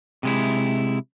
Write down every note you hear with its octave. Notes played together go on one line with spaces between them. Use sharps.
C3 G#3 E4